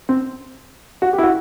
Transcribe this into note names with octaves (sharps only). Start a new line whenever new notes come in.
C4
F#4
G4
E4
F#4